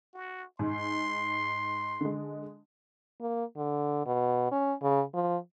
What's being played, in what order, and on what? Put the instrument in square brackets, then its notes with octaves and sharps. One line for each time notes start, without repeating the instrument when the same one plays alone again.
[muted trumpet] F#4
[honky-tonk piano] G#2 [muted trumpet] C6
[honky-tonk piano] D3 G#3
[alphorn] A#3
D3
B2
C#4
C#3
F3